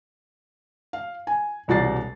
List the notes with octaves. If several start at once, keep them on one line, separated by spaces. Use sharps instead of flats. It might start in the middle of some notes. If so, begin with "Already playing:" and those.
F5
G#5
E1 C2 F#4 D5 A6 C7